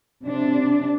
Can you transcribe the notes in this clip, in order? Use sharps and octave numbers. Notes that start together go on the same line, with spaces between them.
C3 D4